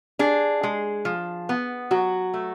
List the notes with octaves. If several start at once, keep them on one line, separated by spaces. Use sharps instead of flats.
D4 G#4
G#3
F3
B3
F#3 F#4
A3